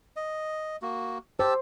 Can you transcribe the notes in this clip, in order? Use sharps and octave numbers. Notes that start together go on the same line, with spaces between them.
D#5
A#3 F#4
G4 C5 A5 E6